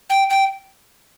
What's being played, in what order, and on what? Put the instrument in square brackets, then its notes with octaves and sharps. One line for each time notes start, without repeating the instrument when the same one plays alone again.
[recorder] G5
G5